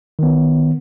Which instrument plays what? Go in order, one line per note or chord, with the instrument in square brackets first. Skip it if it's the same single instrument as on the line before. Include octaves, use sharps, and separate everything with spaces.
[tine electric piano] D#3 B3